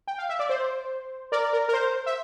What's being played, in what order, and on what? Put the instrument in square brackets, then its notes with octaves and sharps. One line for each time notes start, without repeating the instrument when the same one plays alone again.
[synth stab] G5
F5
E5
D5
C5
A#4 D5
A#4
A#4
C5
E5